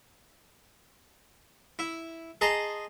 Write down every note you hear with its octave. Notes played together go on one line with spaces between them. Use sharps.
E4
G#4 D#5 A5 A#5 C6